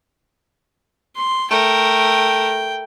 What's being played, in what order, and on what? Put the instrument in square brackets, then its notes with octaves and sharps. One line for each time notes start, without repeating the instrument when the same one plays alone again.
[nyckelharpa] C6
[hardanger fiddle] A3 A#4 [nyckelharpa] G5